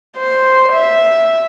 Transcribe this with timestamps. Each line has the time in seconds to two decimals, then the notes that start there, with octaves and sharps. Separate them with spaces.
0.17 C5
0.72 E5